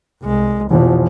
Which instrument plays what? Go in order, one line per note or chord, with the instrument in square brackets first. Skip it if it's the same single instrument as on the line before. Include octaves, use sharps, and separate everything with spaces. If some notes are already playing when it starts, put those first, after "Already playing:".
[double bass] C2 G#3
[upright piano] F1 E3 F3 [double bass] B2